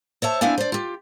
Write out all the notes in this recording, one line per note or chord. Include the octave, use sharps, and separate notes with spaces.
C5 C#5 E5 A5
B3 C4 D4 E4 F5 G#5
C5 D5
F4 G4